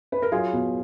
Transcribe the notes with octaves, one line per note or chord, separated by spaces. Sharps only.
B4
A#4
F#3 F4 G#4
B2